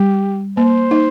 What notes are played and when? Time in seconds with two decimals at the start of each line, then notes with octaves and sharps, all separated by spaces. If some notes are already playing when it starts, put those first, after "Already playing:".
Already playing: G3 G4
0.57 A#3 C5
0.91 D#4